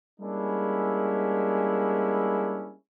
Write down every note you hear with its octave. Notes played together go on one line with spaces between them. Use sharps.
G3 G#3 A#3 C#4 D4 E4